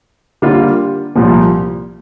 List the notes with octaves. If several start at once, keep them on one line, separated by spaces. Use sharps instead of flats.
D3 G3 A#3 F4
C2 A#2 F3